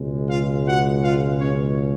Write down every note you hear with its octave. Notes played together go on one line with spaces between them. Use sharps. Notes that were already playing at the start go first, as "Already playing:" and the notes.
Already playing: C#2 B2 G#3
F4 F5
F#4 F#5
F4 F5
C#4 C#5